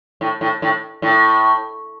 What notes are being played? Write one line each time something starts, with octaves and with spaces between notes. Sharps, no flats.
A2
A2
A2
A2